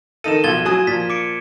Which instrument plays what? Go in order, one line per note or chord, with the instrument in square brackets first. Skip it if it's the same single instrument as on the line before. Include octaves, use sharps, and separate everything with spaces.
[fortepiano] D#3 D#4 A4 [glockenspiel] D#7 E7
[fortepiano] B1 F3 [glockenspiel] G#6 A6 G7
[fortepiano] F#3 G#5 D#6
[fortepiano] A#2 F3 [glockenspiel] A6 B6
[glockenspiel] D6 C#7 D7